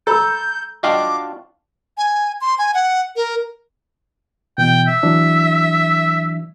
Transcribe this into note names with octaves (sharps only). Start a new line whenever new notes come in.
A4 A#5 B5 E6 G6
D4 F4 F#4 D#5 F5 G5 D6
G#5
C6
G#5
F#5
A#4
B2 E3 G5
E5
E3 F#3 D4